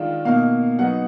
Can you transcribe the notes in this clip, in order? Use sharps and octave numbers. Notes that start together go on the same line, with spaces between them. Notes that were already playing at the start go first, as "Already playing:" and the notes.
Already playing: D#3 G#3 D4 F4
B2 A#3 D#4 F5
F#3 B3 D#4 F#5